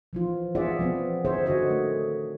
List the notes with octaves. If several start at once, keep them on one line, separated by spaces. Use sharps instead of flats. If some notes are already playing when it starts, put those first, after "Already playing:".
E3 F3 F4
F4 G#4 D5 E5 F#5
F3 B3 C4
D3 G#4 C5 C#5 E5
D3 D#3 F#4 C#5 D#5
A3